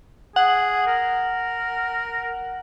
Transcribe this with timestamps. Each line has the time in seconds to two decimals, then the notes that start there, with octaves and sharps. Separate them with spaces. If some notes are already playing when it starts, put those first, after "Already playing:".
0.36 G#4 F#5
0.87 A#4